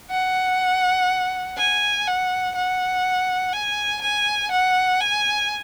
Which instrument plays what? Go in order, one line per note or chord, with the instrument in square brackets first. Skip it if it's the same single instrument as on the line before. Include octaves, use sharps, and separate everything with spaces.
[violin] F#5
G#5
F#5
F#5
G#5
G#5
F#5
G#5